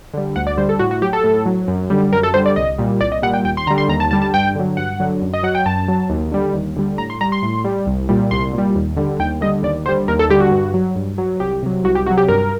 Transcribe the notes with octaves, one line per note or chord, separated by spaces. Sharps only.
D3 G3
D2 F#5
D5
D3 G3 C5
A4
A2 F#4
F#4
F#3 G4
A4
A2
F#3
F#2
D3 G3
F#2 A#4
A4
D3 G3 C5
D5
C2 D#5
A#2 G3
C2 D5
D#5
A#2 G3 F#5
G5
D#2 G5
C6
D3 G3 A#5
C6
D#2 A#5
A5
D3 G3 A5
A5
G2 G5
D3 F#3
G2 F#5
D3 F#3
F#2
D#5
F#3 F#5
G5
F#2 A5
F#3
D#2
D3 G3
D#2
D3 G3
A2 A#5
C6
G3 A#5
C6
A2
G3
C2
A#2 G3
C2 C6
A#2 G3
D#2
D3 G3
D#2 G5
D3 G3 D#5
D#2 D5
D3 G3 C5
D#2 A#4
A4
D3 G3 G4
F#4
G2
F#3
G2
F#3
C2 G4
C3 F#3
C2 F#4
G4
C3 F#3 F#4
G4
G2 A#4